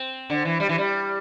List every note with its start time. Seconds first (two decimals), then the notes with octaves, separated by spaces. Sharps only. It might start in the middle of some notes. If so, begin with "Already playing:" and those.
Already playing: C4
0.30 D3
0.45 E3
0.60 G3
0.69 E3
0.78 G3